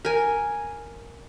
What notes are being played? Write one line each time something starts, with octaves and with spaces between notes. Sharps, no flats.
A#4 G#5